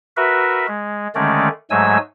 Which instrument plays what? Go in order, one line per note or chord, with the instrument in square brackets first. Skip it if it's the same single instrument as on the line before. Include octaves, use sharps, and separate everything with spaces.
[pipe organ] F#4 A#4 B4 E5
G#3
D3 D#3 G#3 A3 C#4 D5
G#2 F#3 G#3 A3 G#5 E6